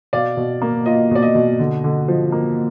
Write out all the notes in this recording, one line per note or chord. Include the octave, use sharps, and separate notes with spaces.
B2 D5 F5
B2
A#3
F4 D#5
B2 D5
D#5
B2
D3
D3
F3
A#3